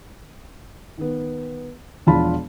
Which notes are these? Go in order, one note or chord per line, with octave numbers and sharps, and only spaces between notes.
D#3 B3
E1 F3 D4 F4 A5 B5